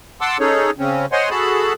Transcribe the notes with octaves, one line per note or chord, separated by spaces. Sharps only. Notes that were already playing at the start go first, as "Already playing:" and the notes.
F#5 A5 C6 D6 E6
C#4 D#4 G#4 A4 C#5
C#3 C4 C#4
C5 C#5 D#5 F#5 G#5 C6
F#4 G#4 A4 A5 B5